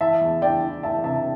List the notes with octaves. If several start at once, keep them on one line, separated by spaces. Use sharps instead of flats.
E3 E5 A5
E2
E3 D5 G5
E3
E3 E5 A5
C3 E5 A5